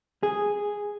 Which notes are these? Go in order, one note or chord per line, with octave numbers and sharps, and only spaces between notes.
G#4